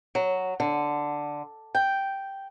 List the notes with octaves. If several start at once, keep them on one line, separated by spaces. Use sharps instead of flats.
F#3
D3
G5